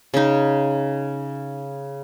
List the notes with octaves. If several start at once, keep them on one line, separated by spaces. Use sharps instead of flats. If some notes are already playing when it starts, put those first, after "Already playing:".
C#3 D#4